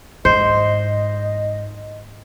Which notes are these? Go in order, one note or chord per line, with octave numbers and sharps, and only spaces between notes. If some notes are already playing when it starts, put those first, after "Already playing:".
G#2 C5 D#5